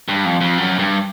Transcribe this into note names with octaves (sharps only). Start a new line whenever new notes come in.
G2
F2
F2
F#2
G2